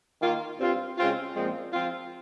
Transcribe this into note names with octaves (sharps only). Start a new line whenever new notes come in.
D#3 A#3 F4
G2 G3 C4 F4
C#3 G#3 C4 F4
A#2 F3 G#3 C4
F3 C4 F4